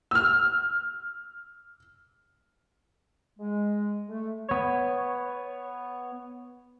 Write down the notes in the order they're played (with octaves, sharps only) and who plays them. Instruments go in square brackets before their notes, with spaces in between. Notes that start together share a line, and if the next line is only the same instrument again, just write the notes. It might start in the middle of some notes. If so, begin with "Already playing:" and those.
[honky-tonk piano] E6 F6
[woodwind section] G#3
A3
[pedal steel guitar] B3 C#5